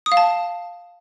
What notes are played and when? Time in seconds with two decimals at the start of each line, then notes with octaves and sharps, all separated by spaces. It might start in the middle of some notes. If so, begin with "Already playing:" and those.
0.06 D#6
0.12 F5
0.17 A5